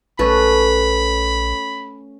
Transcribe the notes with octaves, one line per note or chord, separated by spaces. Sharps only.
A#1 A3 C#4 A4 B4 B5